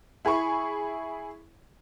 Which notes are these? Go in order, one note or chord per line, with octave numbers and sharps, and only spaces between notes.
E4 G#4 B5 C#6